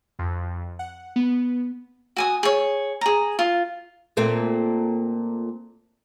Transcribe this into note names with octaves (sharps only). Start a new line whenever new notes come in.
F2
F#5
B3
F#4 G#5 D#6
G#4 C#5
G#4 A#5
F4
A#2 A3 C4